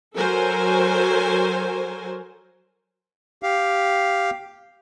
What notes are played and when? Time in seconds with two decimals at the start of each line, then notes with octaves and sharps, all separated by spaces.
0.16 F#3 A4 A#4 C5 G#5
3.43 G4 F5